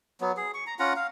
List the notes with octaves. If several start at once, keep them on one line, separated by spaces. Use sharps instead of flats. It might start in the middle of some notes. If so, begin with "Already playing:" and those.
F#3 B3
G#4
C#6
A#5
C#4 F4 F#5 A#5
F5